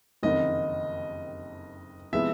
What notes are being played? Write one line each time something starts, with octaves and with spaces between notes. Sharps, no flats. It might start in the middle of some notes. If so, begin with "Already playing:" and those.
F#1 F2 C3 D#3 D#5
C3 F3 G#3 B3 E4 E5